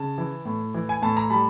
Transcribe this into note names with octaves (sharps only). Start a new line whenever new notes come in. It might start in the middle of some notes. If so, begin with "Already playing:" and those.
Already playing: C#3 A5
E3
A2
E3
G#5
A2 A5
A#5
G3 A5 B5